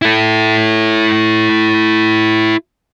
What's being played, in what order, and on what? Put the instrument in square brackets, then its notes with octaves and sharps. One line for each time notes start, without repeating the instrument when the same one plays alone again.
[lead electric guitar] E4 A4